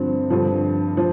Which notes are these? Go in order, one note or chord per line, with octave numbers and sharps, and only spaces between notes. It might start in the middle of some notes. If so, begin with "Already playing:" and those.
Already playing: G2 D3 F3 C4
G2 D3 F3
F3